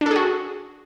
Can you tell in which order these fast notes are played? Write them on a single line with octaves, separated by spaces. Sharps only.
D4 A4 G#4 F#4